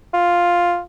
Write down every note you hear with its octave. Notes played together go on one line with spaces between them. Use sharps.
F4